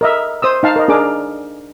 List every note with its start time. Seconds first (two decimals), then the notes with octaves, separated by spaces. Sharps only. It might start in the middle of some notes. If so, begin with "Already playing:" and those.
0.01 A#4 D#5 E5
0.42 C5 D#6 E6
0.63 D#4 F5 A5
0.76 A#4 D#5
0.88 D4 G#4 A#4 D6